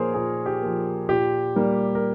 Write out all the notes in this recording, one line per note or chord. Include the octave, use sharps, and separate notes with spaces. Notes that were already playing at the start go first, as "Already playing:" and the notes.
Already playing: A#2 F3 A#3 G#4 A#4 C5 C#5
A#2 G#4
G4
F3 A#3
A#2 G4
G3 A#3
A#4